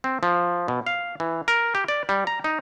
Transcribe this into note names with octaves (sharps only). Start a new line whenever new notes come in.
C4
F3
B2
F5
E3
A#4
G4
D5
G3
A#5
D#4